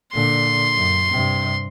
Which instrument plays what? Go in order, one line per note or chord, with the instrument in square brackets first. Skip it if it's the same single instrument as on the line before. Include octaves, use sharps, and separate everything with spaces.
[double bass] A#2 D3 [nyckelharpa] C6
[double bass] F#2
G2 C3